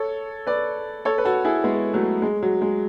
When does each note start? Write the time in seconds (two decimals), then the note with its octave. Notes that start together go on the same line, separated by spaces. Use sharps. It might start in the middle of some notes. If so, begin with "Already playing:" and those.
Already playing: A4 C#5
0.47 B4 D5
1.05 A4 C#5
1.18 B4
1.25 F#4 A4
1.45 E4 G#4
1.64 G#3 B3
1.93 F#3 A3
2.22 G#3
2.43 F#3
2.62 G#3